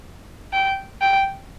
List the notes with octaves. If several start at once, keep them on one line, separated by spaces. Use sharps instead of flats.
G5
G5